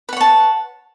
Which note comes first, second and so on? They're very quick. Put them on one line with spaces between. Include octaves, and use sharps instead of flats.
B4 F#5 C#5 A5